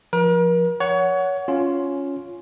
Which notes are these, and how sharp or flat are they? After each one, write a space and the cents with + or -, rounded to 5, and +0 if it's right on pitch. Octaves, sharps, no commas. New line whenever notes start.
F3 +0 A#4 +40
C#5 +25 F#5 +0
C#4 +5 F4 +0